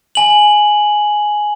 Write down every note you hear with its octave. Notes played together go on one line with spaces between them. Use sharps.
G#5 F#7